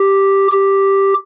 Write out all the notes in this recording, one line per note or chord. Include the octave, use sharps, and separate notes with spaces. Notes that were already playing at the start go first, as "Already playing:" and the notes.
Already playing: G4
G4